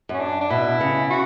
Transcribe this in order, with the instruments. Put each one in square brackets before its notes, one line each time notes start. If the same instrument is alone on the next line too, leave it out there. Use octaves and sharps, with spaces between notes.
[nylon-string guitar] F#2 [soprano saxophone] C#4
[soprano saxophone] D4
D4
[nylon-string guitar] B2 [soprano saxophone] E4
[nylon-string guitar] C#3
[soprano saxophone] F#4